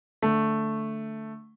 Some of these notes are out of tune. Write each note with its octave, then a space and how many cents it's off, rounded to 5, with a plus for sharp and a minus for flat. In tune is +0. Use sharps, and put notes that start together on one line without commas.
D3 +0 A3 +0